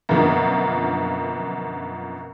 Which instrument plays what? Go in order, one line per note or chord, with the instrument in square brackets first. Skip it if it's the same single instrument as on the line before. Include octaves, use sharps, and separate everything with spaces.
[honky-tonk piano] F#2 B2 D3 F3 A#3